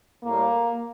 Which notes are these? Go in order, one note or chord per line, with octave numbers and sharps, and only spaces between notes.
A2 G3 A#3